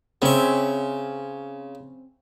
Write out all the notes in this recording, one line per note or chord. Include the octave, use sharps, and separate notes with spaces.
C#3 C4 C#4 E5 C#6